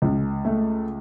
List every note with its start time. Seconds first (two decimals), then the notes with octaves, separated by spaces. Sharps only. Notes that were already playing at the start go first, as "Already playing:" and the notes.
0.02 C#2
0.45 A3